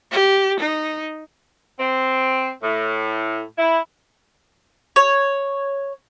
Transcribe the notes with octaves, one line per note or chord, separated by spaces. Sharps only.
G4
D#4
C4
A2
E4
C#5